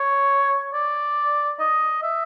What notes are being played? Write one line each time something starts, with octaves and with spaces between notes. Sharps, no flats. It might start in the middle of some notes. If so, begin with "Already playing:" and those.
Already playing: C#5
D5
D#5
E5